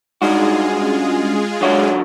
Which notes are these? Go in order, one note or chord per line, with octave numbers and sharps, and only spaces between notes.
G2 G#3 D#4 F4 F#4 G#4
C#4
F#2 D3 F#4 C#5